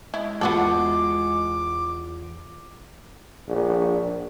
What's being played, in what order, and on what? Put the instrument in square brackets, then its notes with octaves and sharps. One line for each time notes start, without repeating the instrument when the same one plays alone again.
[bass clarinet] G#3 [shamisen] E4
[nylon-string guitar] E2 F4 F#5 [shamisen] B3 F#4 A4 [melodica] D6
[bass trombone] A#1